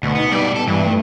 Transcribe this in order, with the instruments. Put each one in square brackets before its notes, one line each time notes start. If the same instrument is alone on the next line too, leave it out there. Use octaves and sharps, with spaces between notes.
[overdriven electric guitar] D2 [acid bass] B2
[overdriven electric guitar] B3 [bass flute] D#4
[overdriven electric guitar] B2 D5 [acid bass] G3
[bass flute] B3 [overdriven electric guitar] A4
[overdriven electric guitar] G2 [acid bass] E3 [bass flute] G3
[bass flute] A3